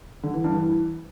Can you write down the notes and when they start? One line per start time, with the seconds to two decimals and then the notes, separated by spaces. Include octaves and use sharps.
0.23 D3
0.34 E3
0.44 G2
0.55 E3